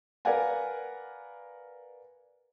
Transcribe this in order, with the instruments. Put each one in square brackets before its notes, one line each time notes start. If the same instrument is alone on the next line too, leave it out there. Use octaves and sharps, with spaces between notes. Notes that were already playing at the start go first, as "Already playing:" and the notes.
[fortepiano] A#4 B4 D5 F5 F#5 G#5